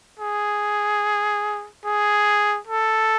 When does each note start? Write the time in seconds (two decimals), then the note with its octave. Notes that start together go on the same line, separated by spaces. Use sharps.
0.20 G#4
1.84 G#4
2.67 A4